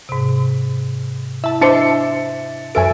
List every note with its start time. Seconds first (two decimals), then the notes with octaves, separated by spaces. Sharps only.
0.09 G#2 C3
1.44 E4 E5 A5
1.61 D4 C5 D#5 E5 A5 C#7
2.75 F#2 A4 E5 G#5 D7